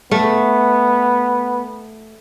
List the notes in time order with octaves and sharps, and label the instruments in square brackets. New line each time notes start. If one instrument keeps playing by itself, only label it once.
[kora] A3 [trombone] B3